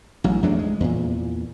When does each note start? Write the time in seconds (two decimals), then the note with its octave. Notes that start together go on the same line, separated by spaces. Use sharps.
0.24 A1 F#3
0.43 E2 F#3 A3 D4
0.59 G#3
0.80 E2 A#2